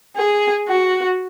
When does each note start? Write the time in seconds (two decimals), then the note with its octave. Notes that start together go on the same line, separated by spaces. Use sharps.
0.15 G#4
0.67 F#4